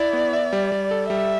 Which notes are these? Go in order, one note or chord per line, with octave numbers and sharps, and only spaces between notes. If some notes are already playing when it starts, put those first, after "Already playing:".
Already playing: E4 D5
B3
E5
G3
G3
A4
G3 E5